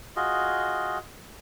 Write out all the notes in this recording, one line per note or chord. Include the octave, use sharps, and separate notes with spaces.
F4 F#4 G#4 D#5